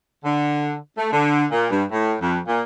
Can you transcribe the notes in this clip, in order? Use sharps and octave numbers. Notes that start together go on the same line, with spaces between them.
D3
A3
D3
A#2
G2
A2
F2
A#2